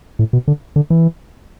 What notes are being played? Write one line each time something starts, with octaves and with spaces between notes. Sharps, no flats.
A2
B2
D3
D3
E3